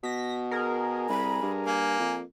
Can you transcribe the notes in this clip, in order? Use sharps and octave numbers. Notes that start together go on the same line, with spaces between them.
B2 A#6 B6
G#4 A#4
C2 B5
G2
A#3 G#5
F2